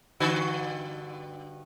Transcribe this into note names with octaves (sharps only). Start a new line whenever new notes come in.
G2 D3 F#4